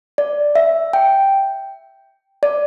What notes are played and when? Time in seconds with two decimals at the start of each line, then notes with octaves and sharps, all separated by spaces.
0.18 D5
0.55 E5
0.93 G5
2.43 D5